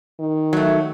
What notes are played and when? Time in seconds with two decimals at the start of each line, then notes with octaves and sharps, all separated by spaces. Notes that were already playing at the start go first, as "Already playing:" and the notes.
0.20 D#3
0.53 F#3 A3